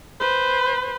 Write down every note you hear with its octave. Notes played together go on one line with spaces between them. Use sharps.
B4 C5